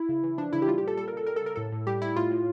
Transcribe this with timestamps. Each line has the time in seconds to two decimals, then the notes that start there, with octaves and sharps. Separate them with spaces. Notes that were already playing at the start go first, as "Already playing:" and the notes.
Already playing: E4
0.09 C#3
0.23 E3
0.38 F3 D4
0.53 C#3 E4
0.62 G4
0.68 G3 F4
0.78 G4
0.83 A#2 A4
0.97 G3 A4
1.08 A#4
1.13 C#3 A4
1.27 G3 A#4
1.36 A4
1.42 C#3 A#4
1.56 A2 A4
1.72 A2
1.87 G3 G4
2.02 G3 E4
2.16 A2 F4
2.31 A2